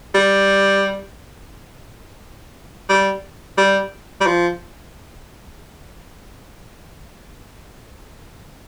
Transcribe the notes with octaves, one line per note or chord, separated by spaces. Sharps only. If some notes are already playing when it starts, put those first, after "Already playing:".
G3
G3
G3
G3
F3